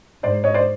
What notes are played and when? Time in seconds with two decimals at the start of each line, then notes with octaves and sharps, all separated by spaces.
0.23 G#2 C5 D5
0.44 C#5 D#5
0.54 C5 D5